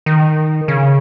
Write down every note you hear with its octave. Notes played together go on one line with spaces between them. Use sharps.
D#3
C#3